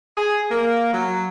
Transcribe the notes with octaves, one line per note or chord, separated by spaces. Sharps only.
G#4
A#3
F#3